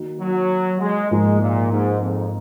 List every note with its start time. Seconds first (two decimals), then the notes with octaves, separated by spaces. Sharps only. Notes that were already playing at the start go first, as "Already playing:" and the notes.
Already playing: D#3 A#3 D#4 F#4
0.20 F#3
0.80 G#3
1.11 G#2 F3 G#3 A#3 D#4
1.40 A#2
1.71 G#2
2.01 F2